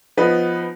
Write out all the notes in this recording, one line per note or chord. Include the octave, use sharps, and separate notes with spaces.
F3 B3 D#4 B4